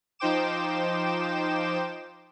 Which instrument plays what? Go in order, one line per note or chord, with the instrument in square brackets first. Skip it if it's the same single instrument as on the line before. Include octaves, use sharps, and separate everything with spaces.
[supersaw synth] F3 D#4 C5 G5 D6 E7